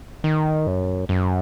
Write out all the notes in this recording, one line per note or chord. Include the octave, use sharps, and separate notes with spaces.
D#3
F#2
F#2